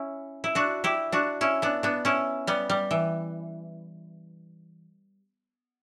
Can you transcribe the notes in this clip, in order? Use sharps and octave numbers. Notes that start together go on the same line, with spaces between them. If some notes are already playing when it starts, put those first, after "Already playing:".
Already playing: C#4 E4
E4
D4 F#4
E4 G4
D4 F#4
C#4 E4
B3 D4
B3 D4
C#4 E4
G3 B3
G3
E3